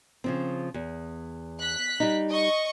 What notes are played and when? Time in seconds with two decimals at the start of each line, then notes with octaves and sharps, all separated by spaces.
0.24 C#3 F3 C4
0.74 E2
1.60 F#6 B6
2.00 G3 D#4
2.31 D#5 C#6